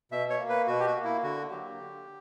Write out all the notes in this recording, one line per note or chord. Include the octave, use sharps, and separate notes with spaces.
B2 E5
C#5
A#3
B4
B2 F#4
G4
F#4
A#3
E4
D3 F#4
F#3 A#3 G4
D3